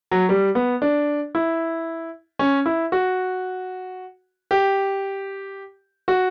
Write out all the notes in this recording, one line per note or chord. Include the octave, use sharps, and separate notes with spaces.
F#3
G3
B3
D4
E4
C#4
E4
F#4
G4
F#4